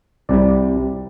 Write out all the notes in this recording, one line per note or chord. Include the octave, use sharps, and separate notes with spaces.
C2 C3 G3 D5